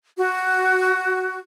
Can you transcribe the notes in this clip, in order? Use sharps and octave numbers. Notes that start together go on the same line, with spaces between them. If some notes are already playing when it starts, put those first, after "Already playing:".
F#4